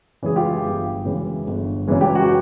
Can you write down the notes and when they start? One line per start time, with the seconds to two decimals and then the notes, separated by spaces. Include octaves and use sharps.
0.22 F#2 C#3 E3 G#3 G#4
0.36 F4 G4
0.64 G1
1.05 F#2 C#3 E3 G#3
1.47 G1
1.88 F#2 C#3 E3 G#3
2.01 G4
2.15 F#4